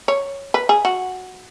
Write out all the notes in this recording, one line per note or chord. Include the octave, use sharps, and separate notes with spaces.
C#5
B4
G#4
F#4